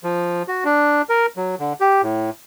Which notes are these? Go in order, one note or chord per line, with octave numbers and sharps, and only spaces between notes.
F3
F#4
D4
A#4
F#3
D3
G4
A2